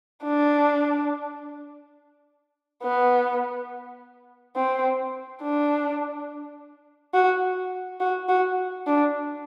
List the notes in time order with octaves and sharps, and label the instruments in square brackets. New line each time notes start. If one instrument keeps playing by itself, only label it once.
[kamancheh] D4
B3
C4
D4
F#4
F#4
F#4
D4